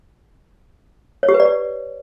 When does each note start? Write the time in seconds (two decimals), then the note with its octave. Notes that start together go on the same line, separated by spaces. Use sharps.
1.23 C#5
1.29 G4
1.34 B4
1.40 D5
1.45 G4